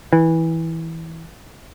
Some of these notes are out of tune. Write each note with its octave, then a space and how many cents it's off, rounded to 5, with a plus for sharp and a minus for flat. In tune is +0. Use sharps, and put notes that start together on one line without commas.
E3 -15